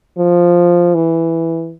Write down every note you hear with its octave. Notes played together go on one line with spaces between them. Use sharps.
F3
E3